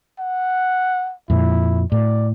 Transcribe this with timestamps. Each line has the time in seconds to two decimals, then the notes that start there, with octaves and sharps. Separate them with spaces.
0.19 F#5
1.30 F2 A#2 E4
1.92 A2 D5